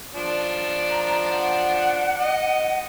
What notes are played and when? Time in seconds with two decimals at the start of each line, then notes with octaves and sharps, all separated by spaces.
0.14 F3 D4
0.91 A#5
1.31 F#5
2.19 D#5